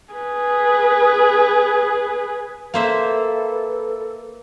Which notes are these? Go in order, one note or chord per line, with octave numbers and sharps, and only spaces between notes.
G#4 B4
A#3 A4 B4 C5 E5